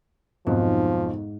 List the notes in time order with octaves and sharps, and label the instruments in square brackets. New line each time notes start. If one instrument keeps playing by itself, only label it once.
[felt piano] B1 F2 [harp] G#2 [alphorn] F3